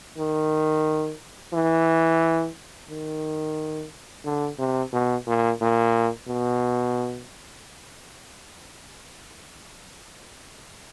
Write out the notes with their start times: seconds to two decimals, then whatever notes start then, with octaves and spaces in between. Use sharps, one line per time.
0.17 D#3
1.53 E3
2.89 D#3
4.25 D3
4.59 C3
4.93 B2
5.27 A#2
5.61 A#2
6.28 B2